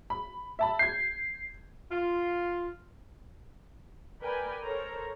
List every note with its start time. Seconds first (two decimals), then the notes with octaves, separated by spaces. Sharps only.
0.10 B5
0.59 E5 A5 B5
0.79 G6 G#6 C7
1.92 F4
4.23 A#4 B4 D5 G5 G#5 B5
4.62 A4 A#4 C5 C#5 A#5